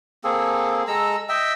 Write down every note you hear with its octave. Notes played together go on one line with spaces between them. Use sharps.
A#3 C4 G#4 A4
G#3 A4 A#5 E6
D#5 E5 G5 E6